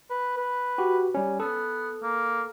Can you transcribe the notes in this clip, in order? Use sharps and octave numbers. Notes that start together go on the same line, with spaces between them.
B4
B4
F#4 G4
G3 C#4
B3 A4
A#3